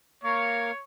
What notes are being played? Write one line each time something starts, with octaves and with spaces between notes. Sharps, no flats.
A#3 A#4 C#5 F5